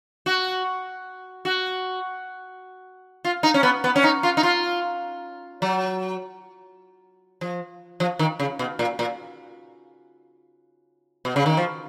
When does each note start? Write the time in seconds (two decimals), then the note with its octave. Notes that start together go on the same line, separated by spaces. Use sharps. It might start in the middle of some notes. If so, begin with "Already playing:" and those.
0.26 F#4
1.45 F#4
3.24 F4
3.43 D#4
3.54 C#4
3.63 B3
3.84 B3
3.96 C#4
4.04 D#4
4.23 F4
4.37 D#4
4.43 F4
5.62 F#3
7.41 F3
8.00 F3
8.19 D#3
8.40 C#3
8.59 B2
8.79 A#2
8.99 A#2
11.25 B2
11.36 C#3
11.46 D#3
11.57 F3